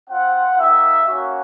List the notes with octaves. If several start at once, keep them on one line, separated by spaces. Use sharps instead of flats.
C4 F4 F#5
A#3 D#4 G4 E5
A#3 C#4 F#4